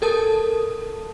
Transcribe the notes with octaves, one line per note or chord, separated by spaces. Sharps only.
A4 A#4 A5 D#6